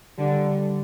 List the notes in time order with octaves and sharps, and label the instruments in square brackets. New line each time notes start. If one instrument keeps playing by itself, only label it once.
[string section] D3 [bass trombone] G3